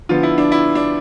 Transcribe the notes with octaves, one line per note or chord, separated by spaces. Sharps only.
D3 F3 B3 F4
E4
D4
E4
D4